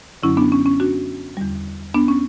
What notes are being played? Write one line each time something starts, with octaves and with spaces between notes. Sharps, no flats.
F#2 D3 F#3 C#4 E4
B3 D4
C#4
C#4
D4 F#4
E2 D3 G3
B3 D4
C#4